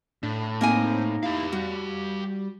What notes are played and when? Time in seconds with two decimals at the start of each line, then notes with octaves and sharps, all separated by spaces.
0.23 A2 D4
0.61 A#3 C4 D#4 G#5
1.23 E4 G4 F5
1.52 G3 F#4